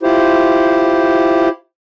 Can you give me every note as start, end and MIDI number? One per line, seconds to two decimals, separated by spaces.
0.03 1.49 64
0.03 1.49 65
0.03 1.49 67
0.03 1.49 72